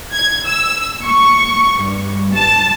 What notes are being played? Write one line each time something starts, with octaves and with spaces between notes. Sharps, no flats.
G#6
E6
C#6
G2
A5